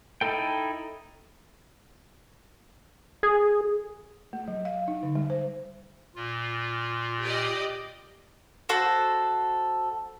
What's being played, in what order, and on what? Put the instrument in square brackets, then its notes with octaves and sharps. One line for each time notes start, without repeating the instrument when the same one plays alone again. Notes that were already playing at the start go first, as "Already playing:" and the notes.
[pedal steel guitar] D#4 E4 A4 G5
[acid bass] G#4
[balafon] A3
F#3
F5
D#4
D3
G3
C5
[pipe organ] A#2 F4
[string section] G4 D5 D#5
[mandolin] F#4 A4 C5